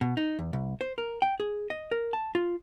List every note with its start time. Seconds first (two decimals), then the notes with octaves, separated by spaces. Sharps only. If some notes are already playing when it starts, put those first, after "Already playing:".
0.01 B2
0.17 D#4
0.39 E2
0.53 C2
0.81 C5
0.98 A#4
1.22 G5
1.40 G#4
1.70 D#5
1.91 A#4
2.13 A5
2.35 F4